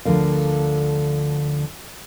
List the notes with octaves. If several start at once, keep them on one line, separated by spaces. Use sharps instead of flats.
D2 D3 F3 A#4 F5